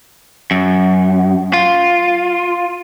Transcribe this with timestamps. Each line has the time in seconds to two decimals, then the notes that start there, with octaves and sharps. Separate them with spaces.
0.51 F#2
1.53 F4